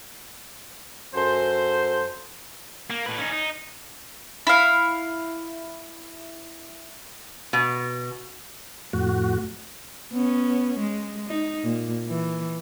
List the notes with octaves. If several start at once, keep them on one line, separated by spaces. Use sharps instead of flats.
F#2 A4 C5
A#3
A2 B4
C#4 D#4
D#4
E4 F5
B2
F2 A2 F#4
B3 C#4
G#3
D#4
A#2
E3